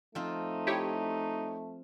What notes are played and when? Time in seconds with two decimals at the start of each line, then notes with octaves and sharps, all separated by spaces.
0.15 F3 A3 C4 D#4 F4
0.67 E4 G4 C#5